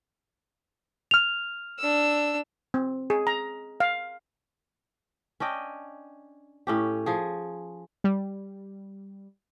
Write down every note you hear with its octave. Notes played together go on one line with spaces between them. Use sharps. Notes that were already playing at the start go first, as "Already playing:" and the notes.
F6 F7
D4 E6
C4
G#4
A#5
F5
C#4 D4 D#5 G5
A2 C#4 G4
F3 G#4
G3